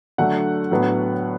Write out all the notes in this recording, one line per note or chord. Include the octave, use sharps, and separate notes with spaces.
D3 F#3 A3 D4 F#5
A2 F#3 B3 D4